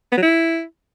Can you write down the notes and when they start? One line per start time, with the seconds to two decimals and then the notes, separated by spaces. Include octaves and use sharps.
0.12 B3
0.17 F#3
0.23 E4